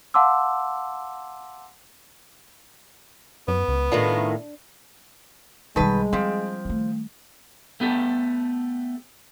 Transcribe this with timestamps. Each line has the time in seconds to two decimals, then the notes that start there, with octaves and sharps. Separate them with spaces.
0.14 F5 F#5 A5 C6 D6 E6
3.48 F#2 B3
3.68 C#2
3.92 A2 D#3 D4 F4
5.76 B1 D3 D#3 G3 G#3 B4 A5
6.13 F3 C4 D4
6.65 D#3 A3
7.80 A3 B3 G4 A4